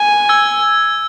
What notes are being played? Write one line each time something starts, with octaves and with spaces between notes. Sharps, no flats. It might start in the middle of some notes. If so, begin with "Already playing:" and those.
Already playing: G#5
E6 G#6